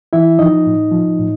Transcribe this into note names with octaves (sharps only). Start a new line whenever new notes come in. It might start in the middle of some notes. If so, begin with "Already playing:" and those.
E3 E4 E5
F3 D#4 D#5
A2
F3
A2